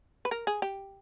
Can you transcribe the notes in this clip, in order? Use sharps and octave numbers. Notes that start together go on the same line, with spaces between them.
B4
A#4
G#4
G4